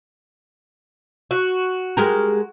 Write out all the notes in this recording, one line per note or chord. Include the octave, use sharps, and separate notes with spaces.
F#4
G#3 G4 A#4